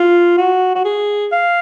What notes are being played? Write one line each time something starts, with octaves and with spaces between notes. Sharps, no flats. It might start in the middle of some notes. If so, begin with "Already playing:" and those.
Already playing: F4
F#4
F#4
G#4
F5